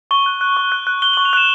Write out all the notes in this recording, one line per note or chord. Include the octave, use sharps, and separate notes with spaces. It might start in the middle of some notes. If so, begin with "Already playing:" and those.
C#6 G7
F#6
F#6
C#6
F#6
F#6
F#6 G7
C#6 F#7
F7
F#6 E7